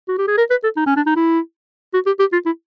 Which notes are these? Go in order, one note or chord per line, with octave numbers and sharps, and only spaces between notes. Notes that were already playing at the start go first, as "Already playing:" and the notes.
F#4
G4
G#4
A#4
B4
A4
D#4
C#4
D4
D#4
E4
F#4
G4
G4
F4
E4